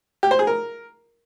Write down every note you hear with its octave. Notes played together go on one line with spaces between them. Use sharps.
G4
C5
G#4
A#4